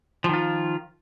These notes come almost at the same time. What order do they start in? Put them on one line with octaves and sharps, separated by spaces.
F3 D#3 F4